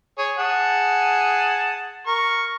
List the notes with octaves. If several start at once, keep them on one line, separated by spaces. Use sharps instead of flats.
G#4 C#5
G#4 F#5 A5
A#4 C#6